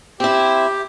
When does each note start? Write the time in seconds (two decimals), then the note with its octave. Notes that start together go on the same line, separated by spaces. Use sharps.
0.20 C4 E4 G4